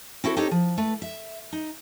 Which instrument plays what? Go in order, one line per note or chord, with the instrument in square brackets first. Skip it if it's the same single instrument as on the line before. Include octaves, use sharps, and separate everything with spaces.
[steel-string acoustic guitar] C4 E4 F#4 A4
C4 D#4 G4 A4 C#5
F3
A3 B4
E5
D#4